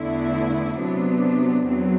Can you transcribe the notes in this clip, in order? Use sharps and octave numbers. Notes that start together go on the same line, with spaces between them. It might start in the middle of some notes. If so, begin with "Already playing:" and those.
Already playing: E2 D3 A3 E4
C3 F#3 B3 D4
E2 F#3 C4